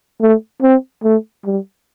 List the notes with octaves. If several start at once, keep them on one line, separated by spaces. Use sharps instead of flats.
A3
C4
A3
G3